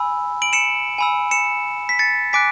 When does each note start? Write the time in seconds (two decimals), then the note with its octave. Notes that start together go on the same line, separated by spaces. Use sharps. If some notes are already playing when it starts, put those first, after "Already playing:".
Already playing: G#5 B5 E6
0.42 D7 F#7
0.53 C#7 E7
0.98 G#5 B5 E6
1.31 C#7 E7
1.89 B6
1.99 A6 C#7
2.33 G#5 D6 F#6 B6 D7